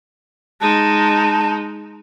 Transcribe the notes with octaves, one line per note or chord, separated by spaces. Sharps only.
G#3 D#4 A5